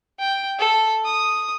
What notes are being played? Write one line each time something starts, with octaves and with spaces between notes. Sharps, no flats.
G5
A4
D#6